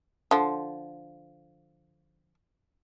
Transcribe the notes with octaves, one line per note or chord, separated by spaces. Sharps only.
D3 F3